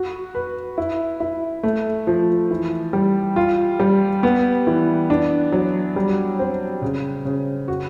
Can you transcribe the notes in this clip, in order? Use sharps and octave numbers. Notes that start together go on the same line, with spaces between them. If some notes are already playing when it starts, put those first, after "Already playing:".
Already playing: F#4
B4
E4
E4
A3
F3
E3
G3
F4
G3
B3
E3
D4
F#3
G3
C4
C#3
C#3
F#4